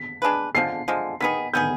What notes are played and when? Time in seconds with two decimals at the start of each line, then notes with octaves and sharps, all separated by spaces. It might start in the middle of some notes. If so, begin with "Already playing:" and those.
Already playing: B6
0.22 G#3 D4 G#4 B4
0.55 D3 F3 G#3 C7
0.88 D3 F3 G#3
1.20 D#3 B3 D#4 G#4 B6
1.53 D#3 B3 D#4 G#4 G6